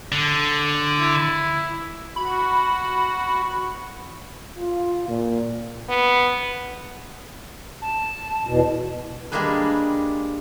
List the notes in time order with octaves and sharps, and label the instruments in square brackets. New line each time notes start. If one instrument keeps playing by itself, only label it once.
[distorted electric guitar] D3
[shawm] E4
[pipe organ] F#4 [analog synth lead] B5
[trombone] F4
A#2
[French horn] B3
[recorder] A5
[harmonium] E2 B2
[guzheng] G3 G#3 A#3 D4 G#4 B4